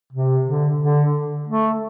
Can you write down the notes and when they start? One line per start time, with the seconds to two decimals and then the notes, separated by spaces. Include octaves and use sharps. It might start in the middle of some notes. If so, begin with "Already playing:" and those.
0.13 C3
0.45 D3
0.80 D3
1.48 A3